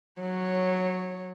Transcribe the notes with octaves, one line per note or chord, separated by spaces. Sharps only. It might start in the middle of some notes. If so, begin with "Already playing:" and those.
F#3 C#5